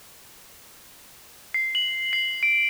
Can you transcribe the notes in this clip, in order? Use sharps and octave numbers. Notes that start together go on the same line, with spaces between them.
C7
F#7
C7
D7